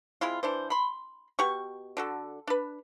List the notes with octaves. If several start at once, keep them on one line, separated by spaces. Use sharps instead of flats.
G#3 C4 E4 F4
E3 D4 C5
B5 C6
B2 G4 F#5 C#6
D3 F#4 A4
D4 B4